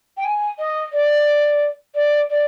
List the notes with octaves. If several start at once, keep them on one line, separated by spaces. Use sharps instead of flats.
G5
G#5
D#5
D5
D5
D5